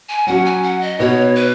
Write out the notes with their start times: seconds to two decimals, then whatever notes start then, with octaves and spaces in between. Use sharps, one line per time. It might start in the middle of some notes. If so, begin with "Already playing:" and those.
0.09 G#5
0.27 F#3 C#4 F#4 F#5
0.45 G#5
0.63 F#5
0.81 D#5
0.99 B2 B3 D#4 F#4 C#5
1.35 B4